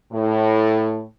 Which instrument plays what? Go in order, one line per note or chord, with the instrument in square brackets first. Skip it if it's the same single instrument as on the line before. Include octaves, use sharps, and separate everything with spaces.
[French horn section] A2